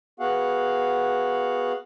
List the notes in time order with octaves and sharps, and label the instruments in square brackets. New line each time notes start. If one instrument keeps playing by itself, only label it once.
[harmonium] B3 F#4 G#4 F5 F#5